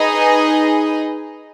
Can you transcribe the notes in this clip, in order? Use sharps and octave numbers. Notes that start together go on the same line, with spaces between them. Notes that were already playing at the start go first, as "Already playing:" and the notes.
Already playing: D#4 G#4 B4 D#5